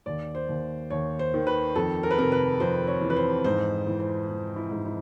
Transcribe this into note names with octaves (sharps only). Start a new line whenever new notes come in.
D#2 D5
C5
D#2
D#2 C#5
C5
D#3
B4
F2 A4
A#4
B4
C3 A#4
B4
F2 C5
C#5
E3
B4
C5
G#2 C5
E3
C5
E3
E4
G#2
E4